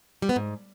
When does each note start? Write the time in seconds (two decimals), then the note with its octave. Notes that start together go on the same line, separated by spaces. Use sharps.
0.22 G3
0.29 B3
0.36 G#2